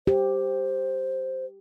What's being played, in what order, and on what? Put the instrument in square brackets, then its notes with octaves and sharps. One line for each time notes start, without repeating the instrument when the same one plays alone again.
[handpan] G4 [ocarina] C5